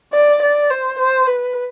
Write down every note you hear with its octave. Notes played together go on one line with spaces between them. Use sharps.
D5
D5
C5
C5
B4